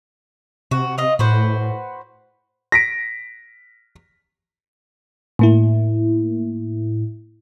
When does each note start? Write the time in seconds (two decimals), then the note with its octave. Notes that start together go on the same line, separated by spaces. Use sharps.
0.71 C3 F#4
0.98 F4 D#5
1.19 A2 F#4 B4 C5
2.72 A#6 B6 D7
5.39 A2 A#3 E4